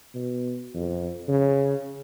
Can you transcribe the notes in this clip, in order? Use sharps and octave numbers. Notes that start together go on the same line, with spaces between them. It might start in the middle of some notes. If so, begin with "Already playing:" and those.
B2
F2
C#3